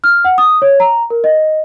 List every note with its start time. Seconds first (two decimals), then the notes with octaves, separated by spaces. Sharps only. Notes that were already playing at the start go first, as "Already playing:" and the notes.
0.04 F6
0.25 F#5
0.38 D#6
0.62 C#5
0.80 A#5
1.10 A#4
1.24 D#5